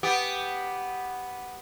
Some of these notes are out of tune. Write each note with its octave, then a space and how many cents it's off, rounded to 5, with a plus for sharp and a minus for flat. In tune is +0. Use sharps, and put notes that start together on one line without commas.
B3 +0 G4 +0